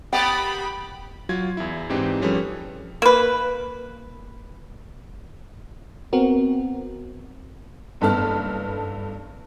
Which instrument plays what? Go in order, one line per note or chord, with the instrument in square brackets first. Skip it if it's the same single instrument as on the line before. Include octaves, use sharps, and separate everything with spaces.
[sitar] A#3 B3 G4 [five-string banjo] G5 [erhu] B5
[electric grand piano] F#3 F4 G#6
E2 E4
G#2 E3 C4 D4 D#4 G4
F3 G3 C#4 G#4 A4 B4
[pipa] A#3 B4
[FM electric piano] B3 C4 F#4 A#4
[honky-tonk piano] F#1 G2 B3 A4 A5 F6